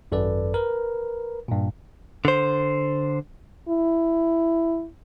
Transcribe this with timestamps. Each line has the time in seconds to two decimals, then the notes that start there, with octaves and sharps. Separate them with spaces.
0.12 G#1 F#2 A4 B4 D5
0.54 A#4 B4
1.48 G2 A#2
2.25 D3 C5
3.69 E4